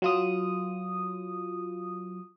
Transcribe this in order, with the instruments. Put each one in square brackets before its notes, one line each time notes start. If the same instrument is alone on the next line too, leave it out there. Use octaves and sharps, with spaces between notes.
[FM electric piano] F#3 F4 D#6